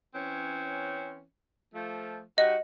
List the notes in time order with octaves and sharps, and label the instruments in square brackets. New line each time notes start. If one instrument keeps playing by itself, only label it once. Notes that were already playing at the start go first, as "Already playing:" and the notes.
[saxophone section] E3 C4 C#4
F3 A3
[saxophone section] G3 D#4 F#4 [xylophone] D#5